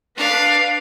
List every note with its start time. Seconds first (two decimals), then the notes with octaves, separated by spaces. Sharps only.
0.17 D4 B4 F5